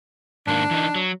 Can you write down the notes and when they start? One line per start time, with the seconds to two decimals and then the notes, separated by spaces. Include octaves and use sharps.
0.47 G#2 D#3 A#3 D4
0.71 E3 D#4
0.95 F#3